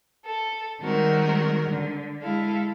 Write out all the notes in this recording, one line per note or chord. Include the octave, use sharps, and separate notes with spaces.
A4
D#3 G3 G#3 C4 F#4 A#4
D3
G#3 E4 A4 F5